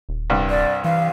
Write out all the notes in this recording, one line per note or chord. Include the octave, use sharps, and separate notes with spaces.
D#1
C2 G2
D5
E3 F5